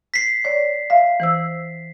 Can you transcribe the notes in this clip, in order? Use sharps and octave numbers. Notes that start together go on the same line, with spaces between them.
B6 C7
C#5 D5
E5 F5
E3 C5 E6